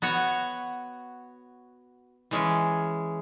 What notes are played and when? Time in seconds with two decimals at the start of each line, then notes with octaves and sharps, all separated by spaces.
0.02 B3 F#4 C#5
2.31 E3 G#3 C#4